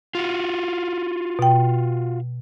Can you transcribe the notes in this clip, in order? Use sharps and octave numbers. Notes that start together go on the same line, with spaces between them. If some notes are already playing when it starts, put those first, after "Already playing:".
F4 F#4
B2 G5